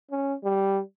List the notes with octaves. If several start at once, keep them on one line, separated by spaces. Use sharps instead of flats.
C#4
G3